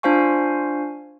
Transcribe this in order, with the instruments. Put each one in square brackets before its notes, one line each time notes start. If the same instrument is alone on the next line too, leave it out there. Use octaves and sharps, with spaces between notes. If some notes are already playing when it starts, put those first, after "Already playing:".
[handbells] D4 F4 C5 F5 G#5 C#6